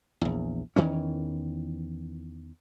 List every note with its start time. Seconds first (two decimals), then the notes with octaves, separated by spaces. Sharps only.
0.21 A#1 E2
0.76 E2 D#3 E3 C#4